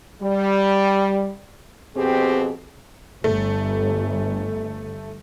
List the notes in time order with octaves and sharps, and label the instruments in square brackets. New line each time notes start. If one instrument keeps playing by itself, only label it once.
[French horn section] G3
F2 B2 C4 G4 G#4
[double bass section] G1 [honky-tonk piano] A3